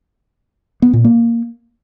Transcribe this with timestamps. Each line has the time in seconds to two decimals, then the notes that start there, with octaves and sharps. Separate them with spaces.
0.82 B3
0.93 A#2
1.04 A#3